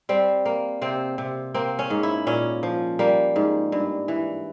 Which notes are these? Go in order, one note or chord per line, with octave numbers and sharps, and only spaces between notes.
G3 C4
A#3
C3 C4
C3
A#3 C4
C#4
G#2
E4
A#2 C#4
F3
G3 A#3
G#2
G2
E3